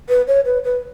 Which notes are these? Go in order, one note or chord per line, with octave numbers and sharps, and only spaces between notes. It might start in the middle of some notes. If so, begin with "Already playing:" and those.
B4
C#5
B4
B4